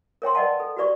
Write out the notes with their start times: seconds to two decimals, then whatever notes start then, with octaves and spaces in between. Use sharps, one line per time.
0.22 A#4 C#5 G5 C6
0.35 B4 D5 D#5 F#5 A5
0.60 A4
0.77 F#4 G4 B4 D5 C#6